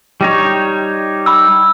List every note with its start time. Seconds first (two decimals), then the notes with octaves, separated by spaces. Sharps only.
0.21 G3 D#4 C#5
1.26 B5 E6